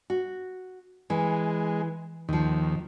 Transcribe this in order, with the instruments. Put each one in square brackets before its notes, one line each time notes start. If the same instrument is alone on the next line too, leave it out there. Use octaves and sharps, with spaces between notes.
[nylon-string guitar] F#4
[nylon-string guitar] E3 [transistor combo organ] G#3
[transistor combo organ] D#2 [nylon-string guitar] D#3 F3